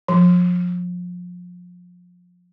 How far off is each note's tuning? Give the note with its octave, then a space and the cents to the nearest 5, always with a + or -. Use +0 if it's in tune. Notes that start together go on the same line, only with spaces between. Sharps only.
F3 +30